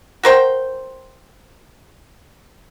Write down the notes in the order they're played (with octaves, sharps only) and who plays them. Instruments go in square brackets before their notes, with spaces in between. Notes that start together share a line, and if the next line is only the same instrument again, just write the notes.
[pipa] F#4 A#4 C5 G5